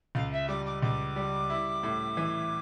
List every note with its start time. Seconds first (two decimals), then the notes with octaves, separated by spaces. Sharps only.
0.15 C#2 F5
0.32 E5
0.48 G3 D6
0.66 D6
0.82 C#2 D6
1.16 G3
1.50 E4
1.83 A2
2.17 E3